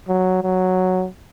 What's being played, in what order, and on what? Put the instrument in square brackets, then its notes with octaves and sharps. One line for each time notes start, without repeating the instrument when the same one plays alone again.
[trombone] F#3
F#3